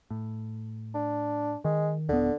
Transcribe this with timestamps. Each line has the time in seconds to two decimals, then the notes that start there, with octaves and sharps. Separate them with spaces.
0.10 A2
0.95 D4
1.64 D#3 G#3
2.09 D#1 D3 B3